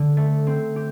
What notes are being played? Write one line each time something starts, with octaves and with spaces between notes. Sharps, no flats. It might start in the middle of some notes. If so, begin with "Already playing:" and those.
Already playing: D3 D4
A3
C4
G4